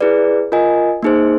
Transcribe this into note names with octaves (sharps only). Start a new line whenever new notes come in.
E4 G#4 B4 D5
F4 A#4 D#5 G#5
A#3 D#4 G#4 C5